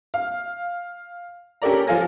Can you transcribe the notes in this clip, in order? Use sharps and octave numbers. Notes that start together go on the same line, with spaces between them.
F5
C#4 G4 A4 A#4 D5 A#5
F3 A4 F5 G#5 A#6